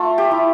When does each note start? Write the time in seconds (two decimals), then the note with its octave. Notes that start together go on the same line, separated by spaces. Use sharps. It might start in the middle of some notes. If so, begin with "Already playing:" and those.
Already playing: A3 F4
0.18 G4
0.31 E4